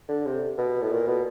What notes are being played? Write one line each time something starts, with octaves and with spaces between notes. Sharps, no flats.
D3
C3
B2
A2
A#2
B2